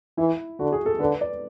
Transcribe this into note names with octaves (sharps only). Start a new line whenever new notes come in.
E3 E4
D3 F#4
G#4
A4
D3 B4
D5